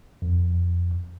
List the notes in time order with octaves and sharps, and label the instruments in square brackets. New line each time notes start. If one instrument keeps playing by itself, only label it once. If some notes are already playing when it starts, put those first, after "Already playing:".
[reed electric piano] F2